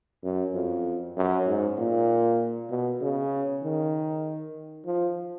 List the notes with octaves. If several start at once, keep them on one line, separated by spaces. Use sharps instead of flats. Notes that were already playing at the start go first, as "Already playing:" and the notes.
F#2
F2
F#2
G#2
A#2
B2
C#3
D#3
F3